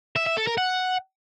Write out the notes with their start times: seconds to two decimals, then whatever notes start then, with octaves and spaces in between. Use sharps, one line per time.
0.16 E5
0.26 E5
0.37 A4
0.47 A#4
0.58 F#5